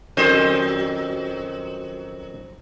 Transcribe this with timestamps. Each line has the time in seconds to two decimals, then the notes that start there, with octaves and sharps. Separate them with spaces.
0.17 F2 D#3 F#3 C#4 C5 D#5